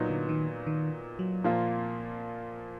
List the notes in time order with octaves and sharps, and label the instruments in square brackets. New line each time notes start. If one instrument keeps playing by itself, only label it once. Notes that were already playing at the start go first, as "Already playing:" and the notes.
Already playing: [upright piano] A#2 F#3 B3 D#4
[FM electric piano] D3
D#3
D#3
F#3
[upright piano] A#2 F3 A#3 F4